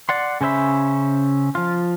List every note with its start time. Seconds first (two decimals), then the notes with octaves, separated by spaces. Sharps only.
0.09 D5 F#5 C6
0.41 C#3 C#4 C5 E5 B5
1.55 F3 F4